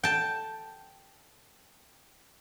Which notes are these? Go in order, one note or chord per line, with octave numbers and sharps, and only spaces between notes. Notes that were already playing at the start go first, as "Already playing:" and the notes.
G5 A5